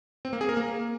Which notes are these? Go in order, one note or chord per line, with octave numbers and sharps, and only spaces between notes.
C4
A#3
G#4
A#4
A#3